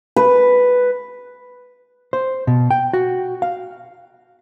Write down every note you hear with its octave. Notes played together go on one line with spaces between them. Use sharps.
B4
C5
B2
G5
F#4
F5